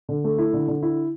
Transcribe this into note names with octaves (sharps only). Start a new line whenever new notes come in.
D3
A3
E4
D3
D3
E4